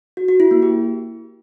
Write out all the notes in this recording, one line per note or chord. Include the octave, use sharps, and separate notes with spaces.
F#4
F#4
E4
A#3
G4